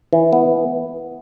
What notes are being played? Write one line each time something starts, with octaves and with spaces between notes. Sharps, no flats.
E3
B3